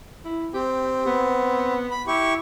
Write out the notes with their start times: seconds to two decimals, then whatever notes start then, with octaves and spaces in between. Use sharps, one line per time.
0.25 E4
0.54 C4 G4
1.06 B3
1.91 B5
2.07 E4 G4 C#6